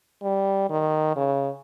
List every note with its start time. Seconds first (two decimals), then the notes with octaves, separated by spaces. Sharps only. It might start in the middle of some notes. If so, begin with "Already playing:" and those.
0.23 G3
0.70 D#3
1.16 C#3